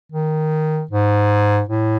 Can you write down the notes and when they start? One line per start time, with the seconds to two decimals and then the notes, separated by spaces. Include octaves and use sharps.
0.12 D#3
0.91 G#2
1.69 A2